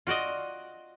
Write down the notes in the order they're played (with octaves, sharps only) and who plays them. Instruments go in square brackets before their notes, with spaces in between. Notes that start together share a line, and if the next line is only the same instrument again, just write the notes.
[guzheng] F4 F#4 D5 D#5